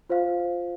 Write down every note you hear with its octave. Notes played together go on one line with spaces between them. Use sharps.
F4 C5 F5